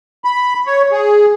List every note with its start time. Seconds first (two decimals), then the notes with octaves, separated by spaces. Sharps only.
0.24 B5
0.66 C#5
0.91 G#4